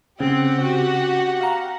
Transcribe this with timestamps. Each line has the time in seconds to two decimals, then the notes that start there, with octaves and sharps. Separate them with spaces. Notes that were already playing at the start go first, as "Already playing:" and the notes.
0.20 C#3 C4 G4 F#5
0.61 F#4
1.41 F5 A#5